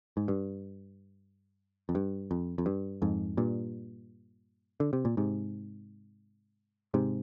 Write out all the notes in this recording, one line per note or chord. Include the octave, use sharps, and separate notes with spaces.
G#2
G2
F2
G2
F2
F2
G2
F2 G#2
G2 A#2
D3
C3
A#2
G#2 C3
G#2 C3